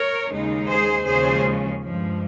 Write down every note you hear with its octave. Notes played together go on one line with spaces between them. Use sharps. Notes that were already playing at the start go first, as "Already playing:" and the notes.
Already playing: A#4 C#5
D#2 C#3 G#3 D#4
G#4 C5
D#2 C#3 F3 G#3 C#4 G#4 C5
G2 F3 G#3